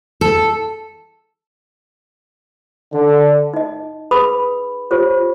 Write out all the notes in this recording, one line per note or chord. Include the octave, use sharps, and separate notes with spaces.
A4
D3
D#4 D#5
G#4 B4 B5 D#6
F4 G4 C5 C#5